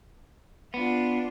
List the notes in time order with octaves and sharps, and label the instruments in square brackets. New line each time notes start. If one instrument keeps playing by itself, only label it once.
[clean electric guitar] B3 [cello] D4 F4